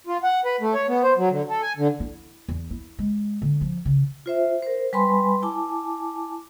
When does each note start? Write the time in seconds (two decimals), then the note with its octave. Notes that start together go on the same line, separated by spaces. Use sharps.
0.07 F4
0.24 F#5
0.45 B4
0.61 A3
0.74 C#5
0.88 B3
1.03 C5
1.17 F#3
1.30 D3
1.49 A4
1.62 G#5
1.77 D3
2.00 E4
2.49 E2
2.71 E4
2.99 G#3
3.42 D3
3.61 F3
3.85 C#3
4.26 F4 C5 E5
4.62 A#4 C5
4.93 G3 B4 G#5 B5 C6
5.42 E4 G#5 A5 D6